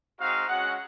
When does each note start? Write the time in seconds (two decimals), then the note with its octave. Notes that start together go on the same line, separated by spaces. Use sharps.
0.19 G#3 C4 D#4 F#4 F5
0.47 G#3 C#4 F#4 F#5